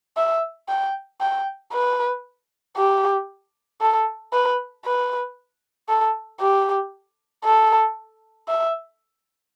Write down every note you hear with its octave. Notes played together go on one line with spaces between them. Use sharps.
E5
G5
G5
B4
G4
A4
B4
B4
A4
G4
A4
E5